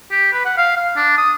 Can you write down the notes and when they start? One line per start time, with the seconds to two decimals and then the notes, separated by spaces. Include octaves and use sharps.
0.12 G4
0.33 B4
0.45 F#5
0.58 F5
0.77 F5
0.96 D4
1.18 D#6